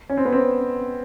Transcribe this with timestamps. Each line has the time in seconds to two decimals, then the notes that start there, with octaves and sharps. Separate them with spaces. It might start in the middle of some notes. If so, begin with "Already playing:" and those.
0.10 C#4
0.17 C4
0.25 B3
0.32 C4